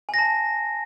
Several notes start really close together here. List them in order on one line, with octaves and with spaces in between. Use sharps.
G#5 A#6 A5